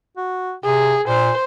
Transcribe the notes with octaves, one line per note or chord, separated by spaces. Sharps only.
F#4
C3 G#4
A#2 C5